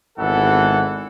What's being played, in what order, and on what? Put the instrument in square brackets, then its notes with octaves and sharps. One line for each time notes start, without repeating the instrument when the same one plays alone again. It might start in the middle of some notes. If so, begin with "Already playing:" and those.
[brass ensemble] G#1 E2 E3 A4 F#5